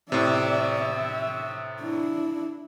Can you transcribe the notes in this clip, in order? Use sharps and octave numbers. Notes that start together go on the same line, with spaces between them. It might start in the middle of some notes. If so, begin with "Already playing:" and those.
A2 C3 D5 E5
E5
D4 E4